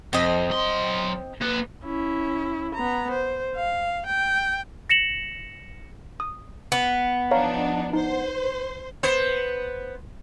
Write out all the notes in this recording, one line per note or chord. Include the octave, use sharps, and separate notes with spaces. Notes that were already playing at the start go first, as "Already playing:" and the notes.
F2 C4 D#5
F#3 C6
A#3 B4
C#4 E4
B3 A#5
C5
F5
G5
A#6 C#7 E7 F#7
D#6
B3
F3 D4 D#4 C#5 F5 A#5
D#4 C5
B3 C5